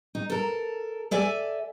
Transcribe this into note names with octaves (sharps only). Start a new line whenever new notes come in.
D#4
A4 A#4
A4 D5 E5 G#5